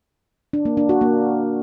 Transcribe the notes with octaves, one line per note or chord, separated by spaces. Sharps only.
D4
A#3
D4
F#4
A#3